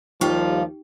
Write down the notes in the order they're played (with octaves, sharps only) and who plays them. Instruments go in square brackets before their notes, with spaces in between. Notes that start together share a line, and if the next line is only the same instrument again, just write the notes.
[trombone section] D#2 F3 [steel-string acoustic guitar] G3 F4 [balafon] D#4 G4 G5